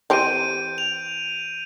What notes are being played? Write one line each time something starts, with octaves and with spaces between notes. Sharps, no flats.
E3 C4 G4 G6 D7 D#7
F7